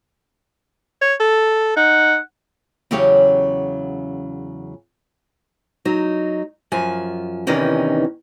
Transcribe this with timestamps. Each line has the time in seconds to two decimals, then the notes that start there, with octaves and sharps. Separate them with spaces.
1.02 C#5
1.20 A4
1.77 D#4 F#5
2.91 E2 C#3 F#3 C#4 G4 C#5
5.85 F#3 D#4
6.72 F#2 F3 G#5
7.47 E2 C3 D#3 E3 C#4 D#4